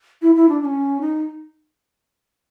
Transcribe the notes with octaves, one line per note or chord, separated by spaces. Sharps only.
E4
E4
D4
D4
C#4
D#4